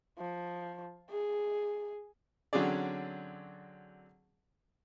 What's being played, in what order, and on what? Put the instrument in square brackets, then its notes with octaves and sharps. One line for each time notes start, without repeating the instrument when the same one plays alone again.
[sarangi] F3
G#4
[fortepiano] D3 F#3 C4 C#4 G#4 D5